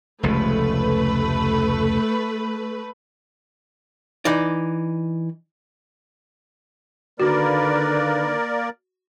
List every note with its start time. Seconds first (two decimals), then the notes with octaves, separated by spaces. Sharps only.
0.23 F1 C#2 A3 B4
4.25 E3 D#4 D5
7.20 D3 D#3 A#3 F#4 A#4 B4 D5